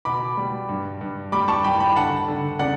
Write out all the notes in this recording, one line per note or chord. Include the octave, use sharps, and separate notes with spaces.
B2 B5 D6
G3
G2
G2
G3 B5 D6
A5 C#6
G2 G5 B5
G5 B5
D3 F#5 A5
D3
C#3 D5 F#5